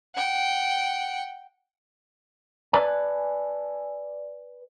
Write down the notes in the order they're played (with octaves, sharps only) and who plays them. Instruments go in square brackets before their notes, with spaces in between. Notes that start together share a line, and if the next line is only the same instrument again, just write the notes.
[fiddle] F#5 G5
[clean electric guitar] B4 D5 G#5 A5